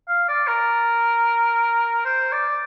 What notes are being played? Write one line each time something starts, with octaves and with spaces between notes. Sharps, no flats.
F5
D5
A#4
C5
D5